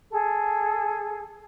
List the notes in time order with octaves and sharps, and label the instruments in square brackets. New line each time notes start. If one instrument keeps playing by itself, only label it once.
[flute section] G#4 A4